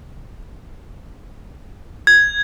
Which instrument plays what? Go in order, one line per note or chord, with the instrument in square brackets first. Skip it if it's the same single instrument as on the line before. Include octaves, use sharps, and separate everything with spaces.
[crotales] G#6